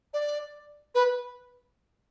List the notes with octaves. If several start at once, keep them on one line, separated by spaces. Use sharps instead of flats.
D5
B4